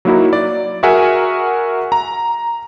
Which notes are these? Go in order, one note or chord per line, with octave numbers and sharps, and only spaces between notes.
F#3 A#3 D#4 E4 F#4
D5
F#4 G#4 A#4 E5 F#5 G#5
A#5